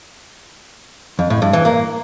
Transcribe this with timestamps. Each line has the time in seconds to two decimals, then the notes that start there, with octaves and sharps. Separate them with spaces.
1.19 F2
1.30 A2
1.42 G2
1.53 E3
1.65 A#3